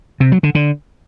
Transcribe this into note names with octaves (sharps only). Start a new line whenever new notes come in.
C3
F#3
D3
D3